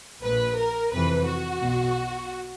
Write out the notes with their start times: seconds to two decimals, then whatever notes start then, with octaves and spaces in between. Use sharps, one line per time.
0.23 A#1 A#2 B4
0.57 A#4
0.92 F2 C3 E3 B4
1.27 F#4
1.62 B1 B2